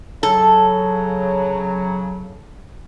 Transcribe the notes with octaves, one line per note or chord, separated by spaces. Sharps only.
C#3 F#3 A4